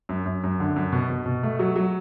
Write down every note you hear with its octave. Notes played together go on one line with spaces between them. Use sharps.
F#2
F#2
F#2
D3
F#2
B2
B2
B2
A3
F#3
F#3